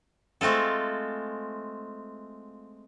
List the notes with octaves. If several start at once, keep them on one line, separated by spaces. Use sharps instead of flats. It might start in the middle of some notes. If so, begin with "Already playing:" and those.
G#3 A3 C4 F4 A4